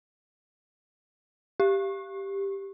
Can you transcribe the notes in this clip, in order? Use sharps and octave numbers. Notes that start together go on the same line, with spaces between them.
G4